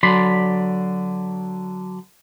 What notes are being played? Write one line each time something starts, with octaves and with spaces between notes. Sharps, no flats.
D3 F#3 D5 B5 C6